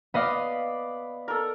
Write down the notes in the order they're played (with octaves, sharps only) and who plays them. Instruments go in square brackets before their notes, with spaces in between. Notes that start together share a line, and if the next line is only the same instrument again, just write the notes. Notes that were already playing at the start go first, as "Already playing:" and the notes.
[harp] B3 D#5 F5 [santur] D5 B5
[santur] A4 A#4